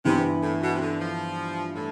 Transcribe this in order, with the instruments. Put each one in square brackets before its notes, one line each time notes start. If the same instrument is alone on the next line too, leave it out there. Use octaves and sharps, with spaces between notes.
[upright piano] G2 E3 B3 E4 [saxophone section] C3
[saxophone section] A2
B2
C3
D3
F3
A2